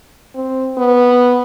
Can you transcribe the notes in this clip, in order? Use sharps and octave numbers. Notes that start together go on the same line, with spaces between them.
C4
B3